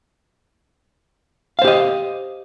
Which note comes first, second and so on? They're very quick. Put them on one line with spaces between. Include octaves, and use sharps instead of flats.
F5 C5 G4 D#5